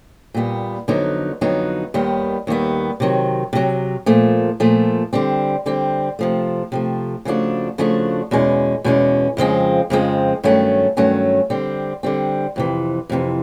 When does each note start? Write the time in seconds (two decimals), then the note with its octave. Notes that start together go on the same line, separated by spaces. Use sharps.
0.34 A#2 G3 B3
0.88 F2 D3 F#3 B3 D#4
1.41 F2 D3 F#3 B3 D#4
1.94 D#2 D#3 G3 B3
2.47 D#2 D#3 G3 B3
3.00 C3 D#3 F#3
3.53 C3 D#3 F#3
4.06 A#2 F3 A3
4.60 A#2 F3 A3
5.13 D3 G3 C4
5.66 D3 G3 C4
6.19 C3 F3 A3
6.72 C3 F3 A3
7.25 C#3 F3 A3 D4 F#4
7.78 C#3 F3 A3 D4 F#4
8.31 E2 B2 G#3 C#4
8.84 E2 B2 G#3 C#4
9.37 F2 C#3 F3 G#3 C4
9.90 F2 C#3 F3 G#3 C4
10.43 G2 D#3 F#3 A3 C#4
10.97 G2 D#3 F#3 A3 C#4
11.50 D3 G3 C4
12.03 D3 G3 C4
12.56 F2 C3 E3
13.09 F2 C3 E3